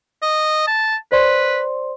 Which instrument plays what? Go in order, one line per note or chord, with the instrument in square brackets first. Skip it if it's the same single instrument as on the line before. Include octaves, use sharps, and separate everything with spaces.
[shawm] D#5
A5
[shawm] B4 [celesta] C5 D5 C6